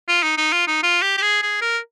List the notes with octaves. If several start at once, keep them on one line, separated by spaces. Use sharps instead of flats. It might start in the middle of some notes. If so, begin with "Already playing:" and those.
F4
D#4
D#4
F4
D#4
F4
G4
G4
G#4
G#4
A#4